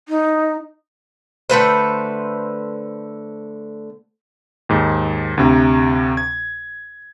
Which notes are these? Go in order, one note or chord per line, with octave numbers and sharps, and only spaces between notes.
D#4
D3 A3 B4 C5
D#2 G#2
D2 C3 A#5
G#6